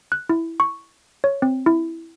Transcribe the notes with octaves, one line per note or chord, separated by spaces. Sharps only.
F#6
E4
C#6
C#5
C4
E4